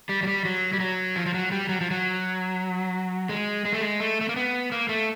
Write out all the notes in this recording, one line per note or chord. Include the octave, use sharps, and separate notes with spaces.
G3
F#3
G3
F#3
G3
F#3
F3
F3
F#3
G3
F#3
F3
F#3
G#3
G#3
A3
G#3
A3
A3
A#3
B3
A#3
A3